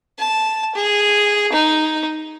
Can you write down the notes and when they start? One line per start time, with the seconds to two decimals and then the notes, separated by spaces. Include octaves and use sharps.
0.19 A5
0.75 G#4
1.53 D#4